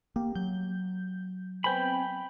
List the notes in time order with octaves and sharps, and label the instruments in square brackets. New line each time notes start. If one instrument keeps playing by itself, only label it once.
[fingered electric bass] A#3 [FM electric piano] G4
[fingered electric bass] F#3 [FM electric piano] G6
[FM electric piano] B3 C4 G#5 [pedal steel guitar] G5 B5